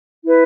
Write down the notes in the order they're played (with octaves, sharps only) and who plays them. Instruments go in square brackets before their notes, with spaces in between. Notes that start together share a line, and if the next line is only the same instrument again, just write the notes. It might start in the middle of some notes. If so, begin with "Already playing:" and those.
[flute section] E4 B4